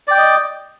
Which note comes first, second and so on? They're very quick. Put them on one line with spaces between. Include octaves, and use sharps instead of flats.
D5 G5 D6 D#5